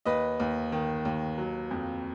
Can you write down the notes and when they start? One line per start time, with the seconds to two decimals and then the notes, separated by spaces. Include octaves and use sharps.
0.05 D#2 B4 D#5
0.40 D#2
0.72 D#3
1.05 D#2
1.38 F#3
1.71 F2